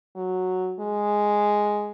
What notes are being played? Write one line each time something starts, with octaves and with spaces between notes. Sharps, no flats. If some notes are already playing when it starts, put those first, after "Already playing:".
F#3
G#3